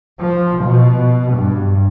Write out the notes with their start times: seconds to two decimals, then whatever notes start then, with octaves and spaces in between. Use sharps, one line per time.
0.20 F3
0.64 B2
1.32 G2